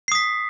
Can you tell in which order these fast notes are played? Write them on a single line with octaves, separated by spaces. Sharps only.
C7 D#6 B6